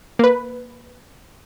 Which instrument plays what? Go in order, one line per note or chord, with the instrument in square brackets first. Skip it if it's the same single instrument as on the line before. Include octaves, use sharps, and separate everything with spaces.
[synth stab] A#3 B4